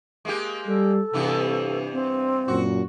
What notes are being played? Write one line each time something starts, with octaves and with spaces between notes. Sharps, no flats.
G#3 A#3 G4
G3 A4
G2 C3 E3 B3
C4
F#2 A#2 F#4